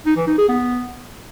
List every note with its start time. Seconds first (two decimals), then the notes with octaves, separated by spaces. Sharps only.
0.06 D#4
0.17 E3
0.27 D#4
0.38 G#4
0.49 B3